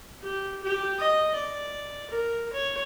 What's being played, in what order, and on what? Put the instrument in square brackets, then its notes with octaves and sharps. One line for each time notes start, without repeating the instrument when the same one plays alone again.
[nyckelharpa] G4
G4
D#5
D5
A#4
C#5